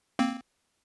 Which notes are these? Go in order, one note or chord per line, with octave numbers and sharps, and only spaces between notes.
A#3 C4